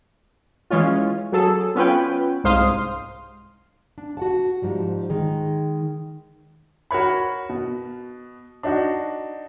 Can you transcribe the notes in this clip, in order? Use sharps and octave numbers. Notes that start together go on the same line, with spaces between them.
E3 G#3 C#4 F4
F#3 G#4 A4 E6
B3 C#4 F4 B4 G5
C2 G#2 C5 F5 C6 D#6
D4
F#4 F#5 A5
G#2 F3 G3
D#3 G#3 D#4 G#4
F#4 A#4 C#5 B5
B2
D4 D#4 F#4